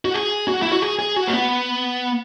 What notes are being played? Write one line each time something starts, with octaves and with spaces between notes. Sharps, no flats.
F#4
G#4
F#4
E4
F#4
G#4
G#4
F#4
A#3
B3